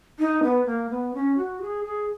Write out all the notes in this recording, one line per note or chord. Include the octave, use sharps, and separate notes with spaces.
D#4
B3
A#3
B3
C#4
F#4
G#4
G#4